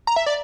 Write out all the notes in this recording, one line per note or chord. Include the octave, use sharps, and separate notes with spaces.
A#5
E5
D5